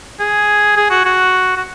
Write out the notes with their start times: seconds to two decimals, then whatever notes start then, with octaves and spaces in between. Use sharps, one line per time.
0.20 G#4
0.76 G#4
0.90 F#4
1.05 F#4
1.57 F#4